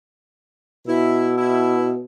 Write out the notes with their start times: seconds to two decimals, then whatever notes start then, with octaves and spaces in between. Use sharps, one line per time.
0.88 B2 E4
1.38 E4